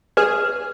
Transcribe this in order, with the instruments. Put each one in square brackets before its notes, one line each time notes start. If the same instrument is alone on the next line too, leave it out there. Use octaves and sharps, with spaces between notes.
[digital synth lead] G#4 [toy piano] B4